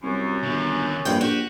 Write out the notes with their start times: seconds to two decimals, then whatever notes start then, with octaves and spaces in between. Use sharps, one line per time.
0.03 C2 F#2
0.43 G1 D#2 D3
1.05 A#1 G2 G5
1.21 F#4 G4